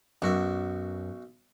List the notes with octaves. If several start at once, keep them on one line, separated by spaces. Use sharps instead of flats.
B1 F#2 F#4 E5